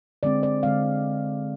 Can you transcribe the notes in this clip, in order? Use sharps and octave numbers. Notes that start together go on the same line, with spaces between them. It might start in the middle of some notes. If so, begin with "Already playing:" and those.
D3 G#3 C4 D5
D5
D3 G#3 C4 F5